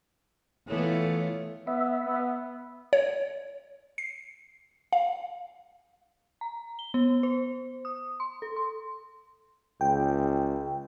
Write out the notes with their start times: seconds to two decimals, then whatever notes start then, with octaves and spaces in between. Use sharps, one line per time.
0.68 E3 A3 B3 F4 A4 C#5
1.67 B3 E5
2.06 B3
2.93 C#5
3.98 C7
4.93 F5
6.41 A#5
6.79 G7
6.94 B3
7.23 C5
7.85 D#6
8.20 C6
8.42 A4
8.56 C6
9.81 C#2 G5